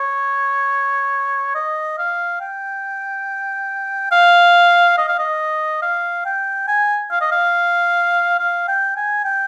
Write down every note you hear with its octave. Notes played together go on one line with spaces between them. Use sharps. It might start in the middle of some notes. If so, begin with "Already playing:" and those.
Already playing: C#5
D#5
F5
G5
F5
D#5
F5
D#5
F5
G5
G#5
F5
D#5
F5
F5
G5
G#5
G5